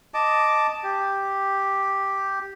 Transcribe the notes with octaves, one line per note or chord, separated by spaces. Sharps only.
D#5 A5 D6
G4